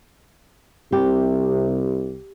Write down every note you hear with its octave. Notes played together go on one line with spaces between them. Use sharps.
C2 C3 G4